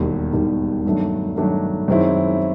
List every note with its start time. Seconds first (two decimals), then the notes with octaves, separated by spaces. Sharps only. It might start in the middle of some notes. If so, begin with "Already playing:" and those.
Already playing: E1 D#2 D#3 G3
0.33 E1 D#2 D#3 G3
0.85 G2 D#3 F#3 A3 D4
1.37 G2 D#3 F#3 A3 D4
1.88 F#2 D#3 G#3 C4 E4